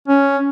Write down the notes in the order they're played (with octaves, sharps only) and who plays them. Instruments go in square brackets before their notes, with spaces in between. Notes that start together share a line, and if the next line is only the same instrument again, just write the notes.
[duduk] C#4